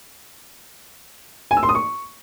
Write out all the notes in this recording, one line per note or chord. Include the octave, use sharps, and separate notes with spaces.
G#5
E6
C6
D#6
C#6